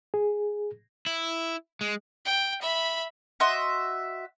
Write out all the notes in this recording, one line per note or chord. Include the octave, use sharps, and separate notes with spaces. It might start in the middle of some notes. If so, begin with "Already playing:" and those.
G#4
E4
G#3
G5
E5 B5
F#4 D#5 E5 C6